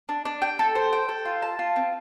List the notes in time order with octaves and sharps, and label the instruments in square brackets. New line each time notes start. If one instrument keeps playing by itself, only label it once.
[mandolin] D4
D4
G5
A4
C5
G5
A4
F4
A5
F4
C4